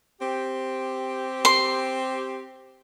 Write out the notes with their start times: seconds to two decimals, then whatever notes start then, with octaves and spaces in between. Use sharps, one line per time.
0.20 C4 G4
1.45 C6